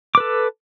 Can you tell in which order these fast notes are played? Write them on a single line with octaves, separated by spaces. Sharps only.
D6 B4 A4